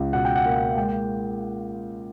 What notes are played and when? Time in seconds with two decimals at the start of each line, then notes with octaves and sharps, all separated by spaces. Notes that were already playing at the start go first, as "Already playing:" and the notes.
Already playing: C#2
0.13 B2 F#5
0.25 G5
0.36 F#5
0.46 A#3
0.76 G#3 G5
0.88 G5